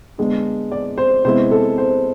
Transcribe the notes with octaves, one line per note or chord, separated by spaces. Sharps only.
D3 G#3 B3 D4
D5
C5
C3 G#3 B3 E4 C5
A4
C5